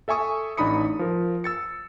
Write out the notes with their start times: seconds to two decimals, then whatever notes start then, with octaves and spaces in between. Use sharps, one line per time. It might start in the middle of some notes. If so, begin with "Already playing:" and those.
0.08 A4 E5 G#5 C#6 D#6
0.57 A1 D4 D#4 B5 D#6 C#7
0.99 F3 A#4
1.44 E6 A6 C#7